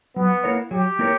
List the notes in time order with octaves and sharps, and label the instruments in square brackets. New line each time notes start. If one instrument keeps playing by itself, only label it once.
[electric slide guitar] F#3 [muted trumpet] B3
[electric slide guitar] A#3 E4 A#4 C#5
[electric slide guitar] F#3 [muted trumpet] G4
[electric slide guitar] A#3 E4 A#4 C#5